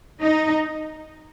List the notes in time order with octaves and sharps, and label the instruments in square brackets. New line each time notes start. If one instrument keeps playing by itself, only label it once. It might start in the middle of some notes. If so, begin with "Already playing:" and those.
[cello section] D#4